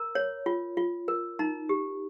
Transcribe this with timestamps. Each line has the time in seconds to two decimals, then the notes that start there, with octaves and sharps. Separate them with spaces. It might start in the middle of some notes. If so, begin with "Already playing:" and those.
Already playing: A#4 A#5
0.15 C#5
0.46 F4
0.77 F4
1.08 A#4
1.39 D#4 A#5
1.69 G4